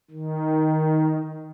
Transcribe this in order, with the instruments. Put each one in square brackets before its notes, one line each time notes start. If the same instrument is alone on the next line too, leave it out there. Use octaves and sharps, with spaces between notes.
[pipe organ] D#3